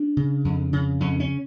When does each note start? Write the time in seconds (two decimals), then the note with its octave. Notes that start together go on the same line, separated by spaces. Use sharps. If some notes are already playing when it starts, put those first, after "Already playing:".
Already playing: D4
0.17 C#3
0.45 F2
0.73 C#3
1.00 F2 C#4
1.20 C#4